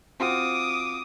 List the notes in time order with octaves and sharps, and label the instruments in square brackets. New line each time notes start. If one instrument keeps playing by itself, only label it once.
[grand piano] C4 F4 F#4 [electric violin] D6 D#6